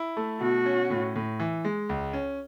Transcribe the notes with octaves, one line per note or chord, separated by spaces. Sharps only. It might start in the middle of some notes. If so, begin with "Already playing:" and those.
Already playing: E4
A3
B2 F#4
C#4
A2
A2
E3
G#3
C#2
C#4